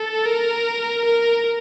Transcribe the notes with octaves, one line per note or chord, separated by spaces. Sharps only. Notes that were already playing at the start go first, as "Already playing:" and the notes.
Already playing: A4
A#4
A#4